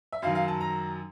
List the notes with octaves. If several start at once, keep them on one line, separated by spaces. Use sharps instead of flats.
E5
F#2 D#3 F#3 F5
F5
A5
A#5